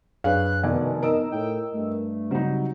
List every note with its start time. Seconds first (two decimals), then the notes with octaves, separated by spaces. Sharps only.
0.24 F#2 D4 G#4 B4 C#5 F5 F#6
0.63 F1 B2 D#3 B3 D5 G#5
1.03 D#4 A#4 D#5 E6 D7
1.32 A2 G5
1.74 G2 A3
2.31 C#3 F#3 G3 C4 D#4